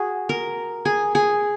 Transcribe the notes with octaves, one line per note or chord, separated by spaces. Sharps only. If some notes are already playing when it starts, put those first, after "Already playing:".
Already playing: F#4 G#4
A#4
G#4
G#4